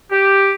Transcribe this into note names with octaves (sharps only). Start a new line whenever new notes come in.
G4